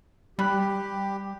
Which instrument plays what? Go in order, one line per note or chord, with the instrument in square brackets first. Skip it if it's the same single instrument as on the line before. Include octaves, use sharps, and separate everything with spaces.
[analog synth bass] G3 [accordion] G4 [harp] B5 F#6